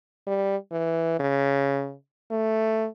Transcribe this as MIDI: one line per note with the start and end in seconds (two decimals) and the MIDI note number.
0.27 0.56 55
0.72 1.18 52
1.19 1.94 49
2.31 2.87 57